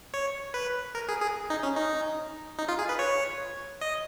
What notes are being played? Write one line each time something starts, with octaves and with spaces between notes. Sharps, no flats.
C#5
B4
A#4
G#4
G#4
D#4
C#4
D#4
D#4
F4
G#4
B4
C#5
D#5